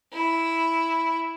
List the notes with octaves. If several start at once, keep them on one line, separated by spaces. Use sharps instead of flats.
E4